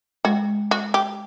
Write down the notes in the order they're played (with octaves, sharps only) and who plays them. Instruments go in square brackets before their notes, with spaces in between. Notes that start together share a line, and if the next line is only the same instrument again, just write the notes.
[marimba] G#3 [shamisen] F#4
[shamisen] F#4
G4